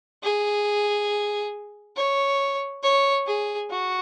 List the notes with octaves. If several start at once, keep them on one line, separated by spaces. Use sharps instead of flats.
G#4
C#5
C#5
G#4
F#4